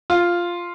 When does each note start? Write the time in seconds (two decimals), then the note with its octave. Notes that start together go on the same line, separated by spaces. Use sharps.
0.10 F4